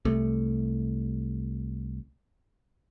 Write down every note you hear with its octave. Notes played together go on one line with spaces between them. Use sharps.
C2 A3